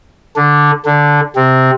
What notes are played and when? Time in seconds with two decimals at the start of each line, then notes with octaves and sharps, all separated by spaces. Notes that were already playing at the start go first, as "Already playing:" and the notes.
0.36 D3 D4
0.85 D3 D4
1.36 C3 C4